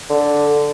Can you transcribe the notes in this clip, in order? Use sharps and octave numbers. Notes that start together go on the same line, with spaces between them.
D3